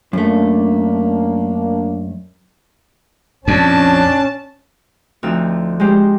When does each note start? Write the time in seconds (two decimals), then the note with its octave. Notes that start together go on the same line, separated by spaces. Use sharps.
0.13 F#2 A3 A#3 D4
3.48 F2 C#4 D4 A5
5.23 D2 F3 C4 D#4 F#4 E6
5.80 G#3 D#4 G4 C5